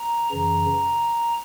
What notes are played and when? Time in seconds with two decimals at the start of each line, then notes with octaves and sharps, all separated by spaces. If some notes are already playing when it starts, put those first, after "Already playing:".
Already playing: A#5
0.31 F#2 C#3 E3 A#5